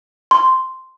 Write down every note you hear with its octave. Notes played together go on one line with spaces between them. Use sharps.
C6